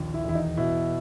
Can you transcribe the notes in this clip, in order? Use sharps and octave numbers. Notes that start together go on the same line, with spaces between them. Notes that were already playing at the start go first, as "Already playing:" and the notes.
Already playing: A#1 D#2
E4
E1 E4
D#4
B2 E4